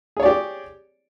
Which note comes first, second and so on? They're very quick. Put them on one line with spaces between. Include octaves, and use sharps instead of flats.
G#4 C#5 D5 G4